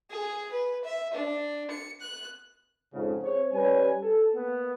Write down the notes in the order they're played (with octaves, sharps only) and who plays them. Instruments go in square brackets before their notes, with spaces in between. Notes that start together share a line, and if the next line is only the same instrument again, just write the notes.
[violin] G#4
B4
E5
D4
C#7
F#6
[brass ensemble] F2 G#2 C#3
C4 G#4 C5 C#5
G3 C#4 B4 C#5 G#5
A4
A#3 B3